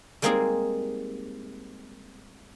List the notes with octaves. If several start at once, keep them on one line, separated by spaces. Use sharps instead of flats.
G3 G#3 A#3 C4 D#4 G#4